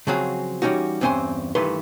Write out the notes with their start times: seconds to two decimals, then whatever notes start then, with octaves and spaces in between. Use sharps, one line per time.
0.07 C#3 F3 F#3 C4 F#4 G#4
0.62 E3 G3 A3 C#4 D#4 F#4
1.01 E2 G2 C4 C#4 G#5 C6
1.55 G2 D#3 E3 A3 B4 C6